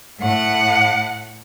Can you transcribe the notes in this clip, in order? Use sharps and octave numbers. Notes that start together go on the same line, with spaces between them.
A2 F#5